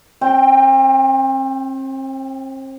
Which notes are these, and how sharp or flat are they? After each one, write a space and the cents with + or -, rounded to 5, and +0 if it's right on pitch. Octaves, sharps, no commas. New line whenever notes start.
C4 +40 G5 +0